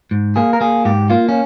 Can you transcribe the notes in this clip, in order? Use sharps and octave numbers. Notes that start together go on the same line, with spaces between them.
G#2
A#3 G#4
A#4
A#3 G#4
G#2 G4
A#3 F4
C#4